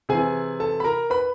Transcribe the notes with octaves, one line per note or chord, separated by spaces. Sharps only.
C3 E3 G#4 G#5
A4 A5
B5
A#4 A#5
B4 B5